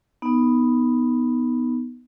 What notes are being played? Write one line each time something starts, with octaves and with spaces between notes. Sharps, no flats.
B3 D#4